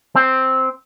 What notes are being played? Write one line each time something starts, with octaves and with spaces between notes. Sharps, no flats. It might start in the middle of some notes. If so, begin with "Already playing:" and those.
C4